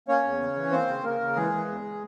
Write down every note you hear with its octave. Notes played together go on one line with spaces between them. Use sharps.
A#3 C#4 C#5
E2
C#3
E3
A#3 C4 C5
C#3
C#3 A#3 A#4
C#3
E3 G#3 G#4
E3
E2